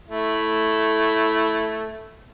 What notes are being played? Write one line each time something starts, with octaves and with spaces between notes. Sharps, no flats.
A3 E4